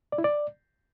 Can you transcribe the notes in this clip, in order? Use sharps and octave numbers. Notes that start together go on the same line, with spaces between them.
D5
E4
D5